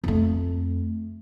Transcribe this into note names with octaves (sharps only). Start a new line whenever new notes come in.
F2 A3